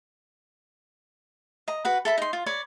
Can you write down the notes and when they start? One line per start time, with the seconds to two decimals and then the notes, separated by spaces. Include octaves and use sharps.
1.68 D#5 A#5
1.85 F#4 B4 F#5
2.05 A4 E5 B5
2.18 D#4 C6
2.33 F4
2.46 C#5 D5 B5